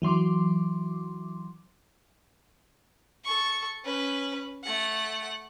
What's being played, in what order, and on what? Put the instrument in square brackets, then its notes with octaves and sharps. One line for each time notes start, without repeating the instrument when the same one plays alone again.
[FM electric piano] E3 F#3 C6 D6
[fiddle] A4 C#6
C#4 B4
A3 F#5